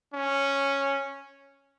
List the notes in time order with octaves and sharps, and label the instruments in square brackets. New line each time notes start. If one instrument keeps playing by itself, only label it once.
[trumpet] C#4